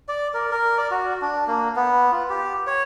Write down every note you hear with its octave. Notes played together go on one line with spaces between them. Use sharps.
D5
A#4
A#4
D5
F#4
D4
A#3
B3
F4
G4
C#5